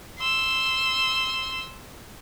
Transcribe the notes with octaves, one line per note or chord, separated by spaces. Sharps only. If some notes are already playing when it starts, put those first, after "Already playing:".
C6 E6